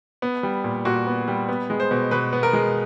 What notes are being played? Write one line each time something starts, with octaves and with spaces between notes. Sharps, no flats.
B3
G3
A#2
A#2 F#4
B3
G3
B3
G#3
C5
B2
B2 B4
B3
A#4
G#3